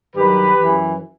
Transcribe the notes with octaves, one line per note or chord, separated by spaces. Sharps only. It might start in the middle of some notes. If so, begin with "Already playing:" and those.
G2 D#3 F#3 G4 B4
F#2 E3